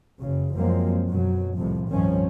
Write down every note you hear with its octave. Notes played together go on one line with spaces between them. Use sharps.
F#1 C#3
F#2 F3 F#3 G#3 A#3 C4
F#2 B2 F#3
C2 F2 A2 C3 F3
C2 G2 D#3 F3 C4 C#4